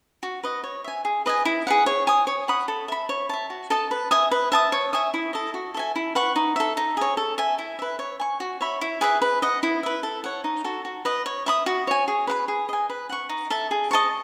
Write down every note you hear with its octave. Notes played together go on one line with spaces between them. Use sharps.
F#4
B4 D#5
C#5
E5 G#5
G#4
B4 D#5 G#5
E4
G#4 B4 F#5
C#5
G#5 D#6
C#5
F#5 B5 D#6
A4
E5 B5
C#5
E5 A5
F#4
A4 D#5 A5
B4
E5 G#5 D#6
B4
E5 A5 D#6
C#5
E5 G#5 D#6
E4
A4 D#5
F#4
A4 E5 G#5
E4
B4 F#5 C#6
D#4
A4 E5
D#4
G#4 C#5
A4
E5 G#5
E4
B4 E5
C#5
G#5 C#6
F#4
C#5 E5 B5
E4
G#4 B4 E5
B4
D#5 F#5
E4
B4 E5
A4
C#5 F#5
D#4
F#4 A4
F#4
B4 D#5
C#5
E5 B5 D#6
F#4
C#5 G#5
G#4
B4 F#5 B5
G#4
D#5 G#5
B4
F#5 C#6
D#4
A4 E5 A5
G#4
D#5 A5 C#6